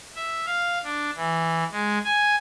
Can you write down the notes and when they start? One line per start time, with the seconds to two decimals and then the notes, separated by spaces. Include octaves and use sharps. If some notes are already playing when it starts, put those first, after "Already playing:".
0.15 E5
0.46 F5
0.84 D4
1.16 E3
1.72 G#3
2.05 G#5